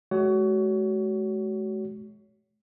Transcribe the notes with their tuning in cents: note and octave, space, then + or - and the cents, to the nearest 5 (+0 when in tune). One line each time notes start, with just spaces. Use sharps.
G#3 +45 F#4 +30 C#5 +20